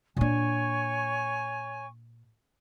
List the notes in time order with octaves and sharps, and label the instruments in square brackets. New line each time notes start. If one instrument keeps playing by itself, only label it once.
[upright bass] A#2 D4 [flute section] C#5 G#5 C#6